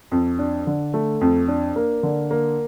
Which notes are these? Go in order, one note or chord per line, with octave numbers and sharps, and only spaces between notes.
F2
D4
D3
A3
F2
D4
A#3
D3
A#3